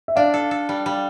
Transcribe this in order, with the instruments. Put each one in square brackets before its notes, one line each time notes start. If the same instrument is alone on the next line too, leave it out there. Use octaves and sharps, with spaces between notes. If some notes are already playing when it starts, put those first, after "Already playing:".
[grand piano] E5
[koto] D4 [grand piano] D5 F5
[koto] A4
A4
G3
G3